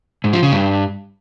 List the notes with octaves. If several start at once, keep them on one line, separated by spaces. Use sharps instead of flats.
G#2
F3
C#3
G2